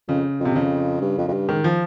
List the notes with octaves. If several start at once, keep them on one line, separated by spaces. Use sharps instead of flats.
F2 C#3
F2 C3
F2 C#3
G2
F2
F2
G2
G#2 D#3
F3